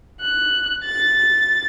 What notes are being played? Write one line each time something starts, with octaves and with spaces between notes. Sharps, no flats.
F#6
A6